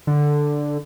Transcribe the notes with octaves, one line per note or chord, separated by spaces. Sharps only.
D3